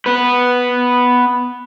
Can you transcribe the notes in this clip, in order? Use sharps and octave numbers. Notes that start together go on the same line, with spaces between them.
B3 B4